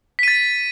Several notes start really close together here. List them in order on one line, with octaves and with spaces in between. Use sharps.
B6 D#7 A6